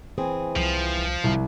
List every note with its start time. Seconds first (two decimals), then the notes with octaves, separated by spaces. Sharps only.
0.18 E3 C4 G#4
0.56 C2 F3
1.24 C2